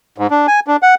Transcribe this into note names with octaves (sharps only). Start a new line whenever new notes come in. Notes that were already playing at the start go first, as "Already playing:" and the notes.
G#2
D4
G#5
D4
F#5